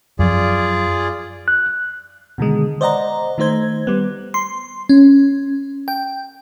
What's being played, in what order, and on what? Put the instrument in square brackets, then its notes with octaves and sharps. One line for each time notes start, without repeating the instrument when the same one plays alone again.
[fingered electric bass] F#2 F3 [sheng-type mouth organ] F4 G#4 D5
[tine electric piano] F#6
[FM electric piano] B2 D3 D#3 G#3
C5 D5 D#5 F#5 A#5
D#3 A3 D#4 C5 G#6
G3 B3
C6
C#4
G5